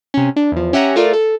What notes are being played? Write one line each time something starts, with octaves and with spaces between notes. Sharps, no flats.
C3 C#4
D4
E2 F3
C#4 G4 E5 F#5 G#5 A#5
A3 F4 A#4 D5
A4